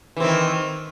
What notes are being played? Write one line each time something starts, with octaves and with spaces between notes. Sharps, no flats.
D#3 E3 C4